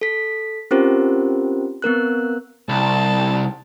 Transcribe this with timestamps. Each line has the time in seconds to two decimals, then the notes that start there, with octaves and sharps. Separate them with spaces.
0.01 A4 B6
0.71 C4 C#4 F4 G4 A#4 C5
1.82 B3 C4 A#4 F#6
2.69 C2 A5